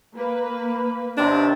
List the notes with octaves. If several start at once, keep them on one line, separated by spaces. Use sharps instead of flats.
A#3 B4
D#2 C3 D4